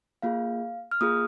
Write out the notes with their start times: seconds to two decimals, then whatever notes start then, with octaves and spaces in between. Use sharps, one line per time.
0.22 A#3 F4 G#4 F5
0.91 F6
1.01 A#3 F4 G#4 D#6